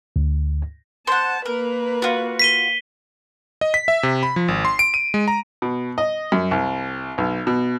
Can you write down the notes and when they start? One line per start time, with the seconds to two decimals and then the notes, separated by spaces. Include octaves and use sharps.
0.16 D2
1.07 C5 F#5 A5
1.45 A#3 A#4 B4
2.02 F4 F#4
2.39 B6 D#7 G7
3.61 D#5
3.74 B6
3.88 E5
4.03 C3
4.23 B5
4.36 F3
4.48 G#1
4.65 C6
4.79 D7
4.94 D#7
5.14 G#3
5.28 A#5
5.62 B2
5.98 D#5
6.32 F#2
6.51 C2
7.18 B1
7.47 B2